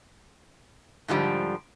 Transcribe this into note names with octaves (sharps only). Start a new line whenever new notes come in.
G#2 D3 F3 G3